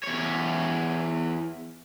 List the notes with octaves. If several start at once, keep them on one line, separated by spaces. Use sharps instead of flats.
E2 C#5